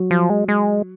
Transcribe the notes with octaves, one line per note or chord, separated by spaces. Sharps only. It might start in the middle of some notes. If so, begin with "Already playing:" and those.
Already playing: F#3
F3
G#3
G#3